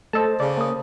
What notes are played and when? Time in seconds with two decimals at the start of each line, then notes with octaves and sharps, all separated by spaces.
0.13 A3 A4 C5 D#5 A5
0.40 C#3 D5
0.57 A#3 D#6